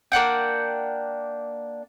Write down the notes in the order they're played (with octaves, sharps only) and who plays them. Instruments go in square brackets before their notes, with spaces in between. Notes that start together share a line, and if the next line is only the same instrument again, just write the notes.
[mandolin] A#3 D4 F#5 G5